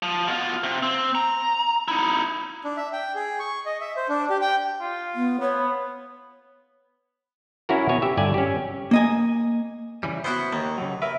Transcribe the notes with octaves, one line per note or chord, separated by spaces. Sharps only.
F3
B2 F4
C3
C4
A#5
D#4 E4
D4
E5
G5
G#4
C#6
D#5
E5
C5
D4
G4
G5
F4
B3
B3 C#5
C#4 E4 F#4 A#4
B2 C#5 G#5
G4 E5
G1 G2 D5 G#5
C#4 G4
A#3 D#5 G#5
C#3 E3 G3
B3 E4 F#4 C5
D#2 A#3
C#3 F#3
A#4 B4 E5